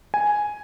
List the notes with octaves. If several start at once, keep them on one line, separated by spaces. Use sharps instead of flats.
G#5